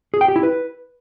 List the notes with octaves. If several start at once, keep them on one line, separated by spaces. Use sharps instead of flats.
G#4
G5
G4
E4
B4